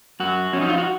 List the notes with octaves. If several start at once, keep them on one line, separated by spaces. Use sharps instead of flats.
F#2 F#4
F3 C#4
D#4
F4
F#4